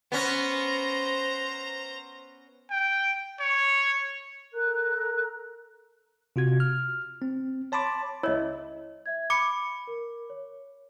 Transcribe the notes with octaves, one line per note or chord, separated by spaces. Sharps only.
B3 C#4 C5 A#5
G5
C#5
A4 A#4 A#5 F#6
C3 F4 F#4 G#6
F6
C4
C#5 A5 B5 C6 D6 A6
C#2 E4 C#5 D#5
E5 G#6
B5 D6 C#7
A#4
C#5